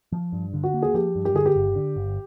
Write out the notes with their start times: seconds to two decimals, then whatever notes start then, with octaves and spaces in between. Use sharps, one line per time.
0.12 F3
0.32 G2
0.54 D3
0.63 F#4
0.74 A#3
0.82 G#4
0.94 F3 G4
1.15 G2
1.25 G4
1.35 D3 G#4
1.46 G4
1.55 G1
1.75 D3
1.96 G1